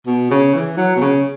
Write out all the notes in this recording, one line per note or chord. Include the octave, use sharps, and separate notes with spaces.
B2
C#3
E3
F#3
B2
C#3